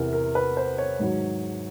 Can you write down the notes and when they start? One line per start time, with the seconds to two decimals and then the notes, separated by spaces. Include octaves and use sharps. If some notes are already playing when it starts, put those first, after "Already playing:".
Already playing: E2 C3 E3 A#4
0.13 A#4
0.35 B4
0.57 C5
0.78 C#5
0.99 G#2 D#3 F#3